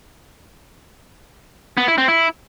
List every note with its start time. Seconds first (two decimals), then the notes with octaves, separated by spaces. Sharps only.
1.77 B3
1.88 E4
1.98 C4
2.08 E4